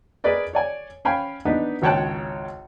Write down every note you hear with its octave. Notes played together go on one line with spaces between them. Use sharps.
G#4 A#4 B4 D5 D#5
C#5 D5 G#5
C#4 F5 G5 G#5 B5
B3 D4 D#4 B4
G#1 C#2 C#5 G5 A5 F#6